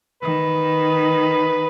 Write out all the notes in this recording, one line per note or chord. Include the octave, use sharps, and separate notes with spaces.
D#3 B4